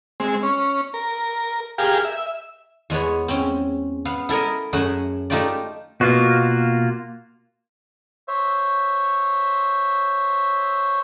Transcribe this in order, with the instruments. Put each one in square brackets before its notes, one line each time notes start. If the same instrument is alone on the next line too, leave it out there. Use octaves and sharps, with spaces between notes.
[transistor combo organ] G#3 C4
C#4
A#4
G4 G#4 A#4 F5
E5
[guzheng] E2 G#3 B3 C#5
C4 C#4
B3 F5
E4 A4 A#4 D#5
F#2 A3 G#4 F#5
A3 D#4 F4 G4 D5
[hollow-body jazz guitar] B2 [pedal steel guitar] A#3 F4 F#4
[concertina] C5 C#5 E5